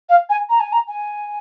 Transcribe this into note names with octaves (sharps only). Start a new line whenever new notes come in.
F5
G#5
A#5
G#5
A#5
G#5